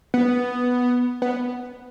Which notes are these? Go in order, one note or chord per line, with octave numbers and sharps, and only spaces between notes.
B3
B3